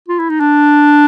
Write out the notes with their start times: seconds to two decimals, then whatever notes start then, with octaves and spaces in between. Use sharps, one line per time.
0.09 F4
0.19 E4
0.30 D#4
0.40 D4